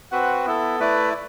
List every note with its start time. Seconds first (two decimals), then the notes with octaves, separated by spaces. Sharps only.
0.11 C4 F#4 B4 F#5
0.46 B3 E4 A4
0.80 A3 E4 B4 D5